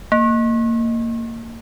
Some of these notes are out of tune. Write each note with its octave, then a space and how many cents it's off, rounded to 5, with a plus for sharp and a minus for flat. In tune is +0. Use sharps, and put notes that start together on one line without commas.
A#3 -20